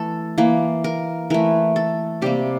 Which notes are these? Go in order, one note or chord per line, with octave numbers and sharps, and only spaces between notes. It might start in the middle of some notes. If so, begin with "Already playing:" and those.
Already playing: E3 A3 A4
E3 A#3
A#4
E3 A3 A#4
A4
C3 G3 A#3 G4